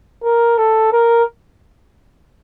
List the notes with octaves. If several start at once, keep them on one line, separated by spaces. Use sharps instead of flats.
A#4
A4
A#4